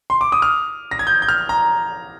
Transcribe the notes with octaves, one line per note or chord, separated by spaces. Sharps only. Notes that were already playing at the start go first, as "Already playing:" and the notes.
C6
D6
D#6
F6
A#6
G#6
G6
G6
F6
A#5